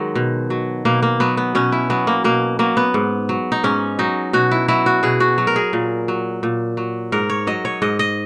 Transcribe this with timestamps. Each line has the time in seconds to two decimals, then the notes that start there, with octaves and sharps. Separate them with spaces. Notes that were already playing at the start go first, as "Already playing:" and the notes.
Already playing: D#3 F#3 G#3
0.15 B2
0.50 F#3
0.85 B2 A#3
1.02 A#3
1.20 F#3 B3
1.37 B3
1.55 B2 C#4
1.72 E4
1.90 F#3 B3
2.07 A#3
2.24 B2 A#3
2.59 F#3 A#3
2.77 B3
2.94 G#2
3.29 F#3
3.52 D#4
3.63 G#2 C#4
3.99 F#3 D#4
4.33 B2 F#4
4.51 E4
4.68 F#3 E4
4.86 F#4
5.03 B2 G#4
5.20 F#4
5.38 F#3
5.47 A#4
5.56 G#4
5.73 A#2
6.08 F#3
6.43 A#2
6.77 F#3
7.12 G#2 A#4
7.30 C#5
7.47 F#3 D#5
7.65 C#5
7.82 G#2 D#5
7.99 D#5